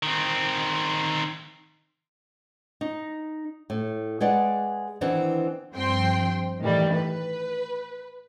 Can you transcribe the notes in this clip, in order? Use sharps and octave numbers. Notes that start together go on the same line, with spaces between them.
D#3 C4
D#4
A2
G#3 G#4 B4 D5 F#5
D#3 E3 B3 C4 D4
G2 F3 C4 G5 C6
A2 D#3 E3 G3
B4